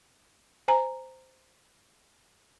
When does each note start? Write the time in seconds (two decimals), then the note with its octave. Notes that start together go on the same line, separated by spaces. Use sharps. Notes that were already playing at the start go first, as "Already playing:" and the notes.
0.68 C5 G#5 A#5